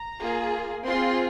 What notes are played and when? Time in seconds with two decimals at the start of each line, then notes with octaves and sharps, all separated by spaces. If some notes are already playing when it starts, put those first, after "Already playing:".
Already playing: A#5
0.19 A#3 F4 G#4
0.85 C4 F4 G#4 C6